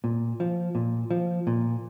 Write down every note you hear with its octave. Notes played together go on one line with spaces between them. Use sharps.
A#2
F3
A#2
F3
A#2